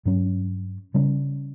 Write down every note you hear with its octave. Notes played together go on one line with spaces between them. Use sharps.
G2 F#3 C#4
C#3 G3 C#4